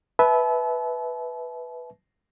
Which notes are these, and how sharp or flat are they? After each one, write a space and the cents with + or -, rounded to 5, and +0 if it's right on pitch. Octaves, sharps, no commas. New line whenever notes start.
B4 +0 E5 -15 A5 -40